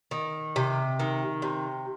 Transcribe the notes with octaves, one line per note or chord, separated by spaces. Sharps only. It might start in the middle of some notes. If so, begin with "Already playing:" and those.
D#3
C3
D#3
C3